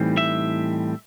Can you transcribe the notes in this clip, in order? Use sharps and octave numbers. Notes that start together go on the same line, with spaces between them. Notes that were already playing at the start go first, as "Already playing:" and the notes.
Already playing: A2 E3 G3 C4 D#4
E5